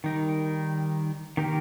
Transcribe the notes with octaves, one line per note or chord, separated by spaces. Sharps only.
D#3 G3 D#4 A#4
D#3 A#3 G4 A#4